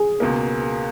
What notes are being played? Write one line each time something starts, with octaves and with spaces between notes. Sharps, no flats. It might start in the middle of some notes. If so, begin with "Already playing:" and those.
Already playing: G#4
C#2 B2 A#3